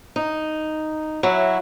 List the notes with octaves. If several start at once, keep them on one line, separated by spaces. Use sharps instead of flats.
D#4
F#3 E4 F#4